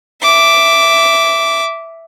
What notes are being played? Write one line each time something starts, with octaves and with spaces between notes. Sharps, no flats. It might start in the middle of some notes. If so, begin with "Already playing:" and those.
E5 D6